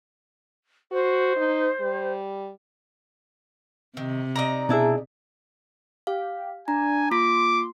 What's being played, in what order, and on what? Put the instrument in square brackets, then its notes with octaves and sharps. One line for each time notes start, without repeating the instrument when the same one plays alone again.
[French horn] F#4 [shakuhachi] C5
[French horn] D#4
G3
[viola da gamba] C3 [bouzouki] D#3
[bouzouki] D#4 D5 A#5
[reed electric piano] B2 G#4 [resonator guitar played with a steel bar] D4 E4 E5
[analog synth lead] G4 [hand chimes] F5
[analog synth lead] D4 [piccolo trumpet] G#5 [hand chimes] A#5
[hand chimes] A#3 F4 B6 [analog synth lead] C6 [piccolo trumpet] D6